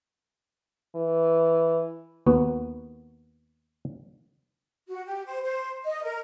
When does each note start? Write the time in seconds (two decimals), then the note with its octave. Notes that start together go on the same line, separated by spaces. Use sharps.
0.95 E3
2.26 D#2 B3 F#4
4.88 F#4
5.05 G4
5.26 C5
5.42 C5
5.84 D#5
6.03 A#4